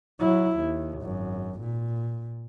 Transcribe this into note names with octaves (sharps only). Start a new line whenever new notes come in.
F#3 E4
D#2
G#1 F#2
A#2